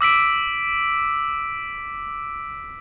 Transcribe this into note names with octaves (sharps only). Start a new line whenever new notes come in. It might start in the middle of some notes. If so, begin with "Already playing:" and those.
D6 E6 B6 D7